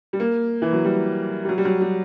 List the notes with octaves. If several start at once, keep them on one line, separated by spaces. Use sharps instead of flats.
G3
A#3
E3
F#3
G3
G3
F#3
G3
F#3
G3